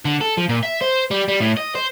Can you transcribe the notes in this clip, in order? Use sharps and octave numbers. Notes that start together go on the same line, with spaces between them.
D3
A4
F3
A#2
E5
C5
G3
G3
A2
D#5
C5